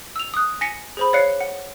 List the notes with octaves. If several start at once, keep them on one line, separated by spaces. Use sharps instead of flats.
E6 F7
D#6 F#6
G#5 A#6 B6 C#7
G#4 C5 B5
C#5 D5 F5 F#6 C7 C#7
F#5